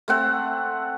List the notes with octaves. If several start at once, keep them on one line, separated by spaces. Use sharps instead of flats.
A3 C4 F#5